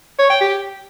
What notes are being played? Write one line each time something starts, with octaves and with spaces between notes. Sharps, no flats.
C#5
G5
G4